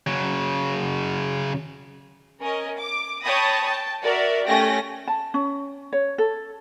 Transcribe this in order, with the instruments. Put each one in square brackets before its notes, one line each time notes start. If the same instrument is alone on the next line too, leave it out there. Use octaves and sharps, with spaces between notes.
[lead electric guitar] C#3 F#3
[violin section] C#4 A#4 D#5
D6
C#5 G5 A5 B5 D#6 A#6
G5 A5
F#4 A#4 D5 E5
A3 C#4 G4 G5 A#6
[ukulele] A5
C#4
C#5
A4